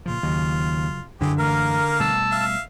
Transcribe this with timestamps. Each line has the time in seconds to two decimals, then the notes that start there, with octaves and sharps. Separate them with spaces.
0.06 A#2 C#3 F3 F4
0.23 D#2 C#3 F#3
1.21 F#2 D3 E3 G4 G#4
1.38 F#2 E3 A3 A#3 A#4 F5
2.00 B2 G3 A3 A5 E6
2.31 E5 F5